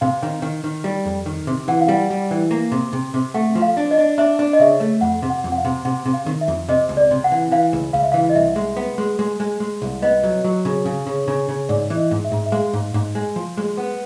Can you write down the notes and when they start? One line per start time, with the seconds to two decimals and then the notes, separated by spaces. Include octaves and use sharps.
0.01 C3 F5
0.23 D#3
0.42 D#3
0.64 D#3
0.84 G3
1.05 F2
1.26 D#3
1.47 C3
1.68 E3 F#5
1.81 F5
1.88 G3 F#5
2.10 G3
2.31 E3
2.51 A#3
2.72 C3
2.93 C3
3.14 C3
3.34 A3 F#5
3.55 F3
3.62 F5
3.77 D4
3.91 D#5
3.98 D4
4.18 D4 E5
4.39 D4
4.53 D#5
4.60 C#3 E5
4.80 A3
5.01 F2 F#5
5.22 C3
5.30 F#5
5.44 F2
5.52 F#5
5.57 F5
5.65 C3
5.85 C3 F#5
6.06 C3
6.13 F5
6.26 D#3
6.41 E5
6.48 F2
6.69 C3 D#5
6.89 C#2
6.97 D5
7.11 C3
7.24 F#5
7.32 E3
7.51 E3 F5
7.73 C#2
7.93 C#2 F5
8.03 E5
8.12 E3 F5
8.29 D#5
8.35 C2 E5
8.56 G#3
8.77 B3
8.98 G#3
9.19 G#3
9.40 G#3
9.60 G#3
9.82 C2
10.02 B3 D#5
10.23 F#3
10.44 F#3
10.65 C#3
10.86 C#3
11.07 C#3
11.28 C#3
11.49 C#3
11.69 G#2 D5
11.90 E3
11.97 D#5
12.11 G#2
12.24 E5
12.32 G#2
12.46 E5
12.52 G#3 F5
12.73 G#2
12.94 G#2
13.15 G#3
13.36 F3
13.57 G#3
13.77 B3